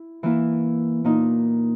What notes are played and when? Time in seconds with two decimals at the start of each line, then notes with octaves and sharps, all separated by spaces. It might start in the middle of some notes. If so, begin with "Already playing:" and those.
Already playing: E4
0.23 E3 A#3 E4
1.04 A#2 A#3 D#4